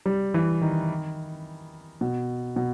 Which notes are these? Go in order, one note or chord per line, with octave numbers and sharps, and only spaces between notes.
G3
E3
D#3
B2
B2